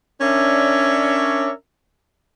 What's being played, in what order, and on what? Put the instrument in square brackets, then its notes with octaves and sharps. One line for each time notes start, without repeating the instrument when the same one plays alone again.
[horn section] C#4 D4 A#4 C#5 D5 E5